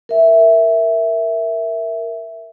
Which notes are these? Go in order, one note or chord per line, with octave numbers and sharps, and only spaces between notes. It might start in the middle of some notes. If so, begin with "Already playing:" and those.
A#4 E5